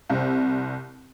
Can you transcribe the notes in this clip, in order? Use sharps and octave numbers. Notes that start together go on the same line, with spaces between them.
C2 C4